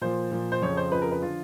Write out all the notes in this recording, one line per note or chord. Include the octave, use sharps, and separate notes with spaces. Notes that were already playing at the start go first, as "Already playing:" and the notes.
A#2 F3 C5
A#2 F3
C5
F2 C#3 F3 C#5
C5
F2 C#3 F3 B4
A#4
B4
D3 F3 F4